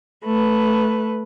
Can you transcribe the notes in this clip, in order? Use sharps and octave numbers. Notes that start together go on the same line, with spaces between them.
A3 B4